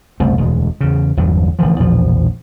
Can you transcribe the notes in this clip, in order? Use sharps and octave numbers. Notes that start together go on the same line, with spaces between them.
F#1 C2 A3 C4
E1 D2 G#3
E2 C#3
G1 E2 F#3
A1 D3 E3 F3
A#1 E2 B2 F3